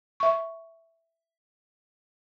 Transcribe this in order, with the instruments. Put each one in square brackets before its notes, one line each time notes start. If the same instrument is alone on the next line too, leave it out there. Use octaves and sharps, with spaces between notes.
[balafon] E5 C#6